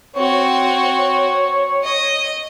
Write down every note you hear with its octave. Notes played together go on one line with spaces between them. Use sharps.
C4 F#4 C#5
D#5